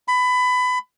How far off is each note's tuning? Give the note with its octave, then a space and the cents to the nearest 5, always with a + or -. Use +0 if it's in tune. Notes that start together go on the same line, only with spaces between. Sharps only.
B5 +20